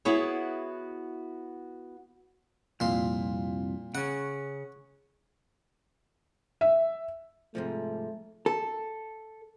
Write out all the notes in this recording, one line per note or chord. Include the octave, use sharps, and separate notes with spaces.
B3 E4 F#4 G#4 C#5
C2 F2 A#2 C6
C#3 C#4 F#5
E5
G#2 C3 F3 A3
A4